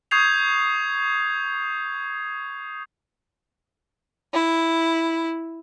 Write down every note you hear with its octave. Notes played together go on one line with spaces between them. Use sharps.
C#6 D#6 G6 G#6 C7 F7
E4